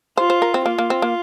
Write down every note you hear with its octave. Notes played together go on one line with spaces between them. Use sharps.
F4 C5
C5
A#4
C4
A#3 F4
A#3
C4
A#3